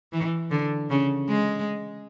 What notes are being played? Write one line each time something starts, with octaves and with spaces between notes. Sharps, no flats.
E3
D3
C#3
G#3